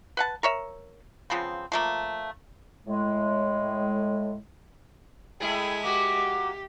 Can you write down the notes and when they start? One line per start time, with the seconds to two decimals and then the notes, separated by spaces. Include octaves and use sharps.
0.17 B4 F#5 A5
0.43 A#4 C#5 E5
1.30 C#3 F3 B3 C4
1.72 F3 A3 A#3
2.87 A2 G#3
5.40 G#3 A3 E4 G#4 E5 G5
5.84 A#3 F#4 G4 D6